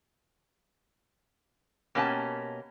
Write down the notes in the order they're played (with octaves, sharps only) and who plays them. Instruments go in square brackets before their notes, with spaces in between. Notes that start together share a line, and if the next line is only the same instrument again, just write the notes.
[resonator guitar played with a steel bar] B2 A#3 C#4 G4 G#5 A5